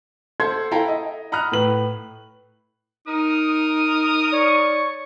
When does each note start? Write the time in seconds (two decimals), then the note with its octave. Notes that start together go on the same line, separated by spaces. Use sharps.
0.40 A4 C5 F#5 C6 G#6
0.71 E4 A4 F5 G5 A#5
0.88 D#5
1.32 F#5 A#5 B5 D#6 F6 F#6
1.52 A2 B4 F#7
3.08 D#4 A#4 D#6
4.33 C#5 D5 C#6